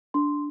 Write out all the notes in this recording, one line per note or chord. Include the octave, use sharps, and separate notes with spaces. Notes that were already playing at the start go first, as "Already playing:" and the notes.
D4 C6